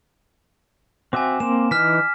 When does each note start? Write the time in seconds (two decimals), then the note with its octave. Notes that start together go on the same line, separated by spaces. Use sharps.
1.13 C4 F#4 E5 G#5 D6
1.40 A#3 C4 E7
1.71 E3 D#4 F6 B6